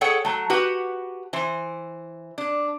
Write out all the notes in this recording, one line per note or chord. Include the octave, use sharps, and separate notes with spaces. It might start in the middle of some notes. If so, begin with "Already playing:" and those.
G#4 A4 C#5 F#5 G5
F#3 A3
F#4 G4 B4 F#5
E3 C5
D4